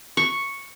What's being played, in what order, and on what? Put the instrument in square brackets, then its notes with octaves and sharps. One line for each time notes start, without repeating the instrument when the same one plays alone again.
[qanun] C#6